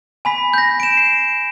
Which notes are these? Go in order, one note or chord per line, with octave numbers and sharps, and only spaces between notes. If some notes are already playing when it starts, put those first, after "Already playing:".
G#5 B5 B6
G6 A#6
D7 E7
C7